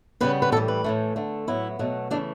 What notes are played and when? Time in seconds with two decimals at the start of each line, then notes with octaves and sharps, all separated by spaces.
0.21 C#3 E3 G3 B3 B4
0.42 B4
0.52 A2 E3 G3 A4
0.68 B4
0.84 A2 E3 A3
1.16 D3 A3
1.47 A2 F#3 B3 E4
1.79 B2 F#3 A3
2.11 C#3 E3 A3 D4